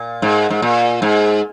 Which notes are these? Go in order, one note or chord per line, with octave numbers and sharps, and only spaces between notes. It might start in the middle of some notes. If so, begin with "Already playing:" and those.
Already playing: A#2
G#2
G#2
A#2
G#2